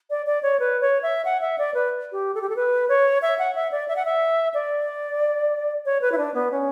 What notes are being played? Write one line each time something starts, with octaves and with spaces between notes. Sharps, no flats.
D5
D5
C#5
B4
C#5
E5
F#5
E5
D5
B4
G4
A4
G4
A4
B4
C#5
E5
F#5
E5
D5
E5
F#5
E5
D5
C#5
B4
E4
D4
B3
C#4